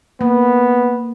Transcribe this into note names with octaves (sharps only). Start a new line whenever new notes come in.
A#3 B3